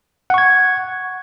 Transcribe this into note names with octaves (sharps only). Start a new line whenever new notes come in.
F#5 C#6 G#6